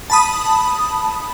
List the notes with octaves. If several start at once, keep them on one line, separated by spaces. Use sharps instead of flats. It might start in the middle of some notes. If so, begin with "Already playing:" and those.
A5 B5 D#6